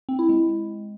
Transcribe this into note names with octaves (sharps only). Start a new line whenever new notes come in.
C4
E4
G#3